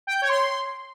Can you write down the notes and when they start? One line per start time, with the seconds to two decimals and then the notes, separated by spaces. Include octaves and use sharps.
0.07 G5
0.14 G6
0.22 C#5
0.29 C6